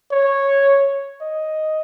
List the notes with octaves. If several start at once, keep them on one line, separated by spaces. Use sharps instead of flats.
C#5
D#5